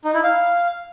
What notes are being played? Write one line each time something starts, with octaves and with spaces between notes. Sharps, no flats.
D#4
E4
F5